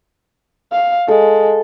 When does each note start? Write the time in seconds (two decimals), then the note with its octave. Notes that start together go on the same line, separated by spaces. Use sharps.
0.72 F5
1.08 G#3 A4